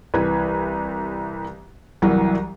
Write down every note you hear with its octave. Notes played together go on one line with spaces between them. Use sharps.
C2 E3 B4 B5 G#6
C2 E3 F#3 G3 A#4